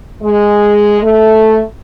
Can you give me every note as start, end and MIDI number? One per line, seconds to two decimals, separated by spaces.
0.22 0.99 56
1.02 1.61 57